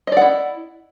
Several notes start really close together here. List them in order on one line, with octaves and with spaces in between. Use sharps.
D#5 D5 F#5 E4